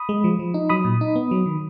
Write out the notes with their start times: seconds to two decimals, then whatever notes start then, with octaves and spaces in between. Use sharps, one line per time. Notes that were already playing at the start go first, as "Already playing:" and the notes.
Already playing: B5 D#6
0.09 G#3
0.24 F3
0.39 F3
0.54 D#4
0.69 F#3 B5 D#6
0.85 A#2
1.01 D#4
1.16 B3
1.31 F#3
1.46 D#3